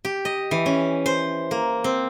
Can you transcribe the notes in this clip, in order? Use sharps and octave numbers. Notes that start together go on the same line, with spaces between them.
G4
D#5
E3
C#4
C5
A#3
C4